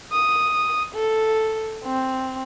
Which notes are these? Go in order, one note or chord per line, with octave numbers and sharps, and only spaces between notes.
D#6
A4
C4